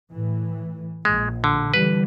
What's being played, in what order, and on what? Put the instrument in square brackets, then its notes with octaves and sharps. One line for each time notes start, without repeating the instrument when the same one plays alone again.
[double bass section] A2 E3
[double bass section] A#1 [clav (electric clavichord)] G#3
[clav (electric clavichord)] D3
[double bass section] D3 E3 G3 [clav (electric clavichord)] B4